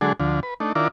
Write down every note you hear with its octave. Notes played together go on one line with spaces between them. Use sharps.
D3 F#3 G#3 D4 G#4 A4
D2 D3 F3
B4
A3 D4 D#4
D#3 D4 E4 F4 A#4 D5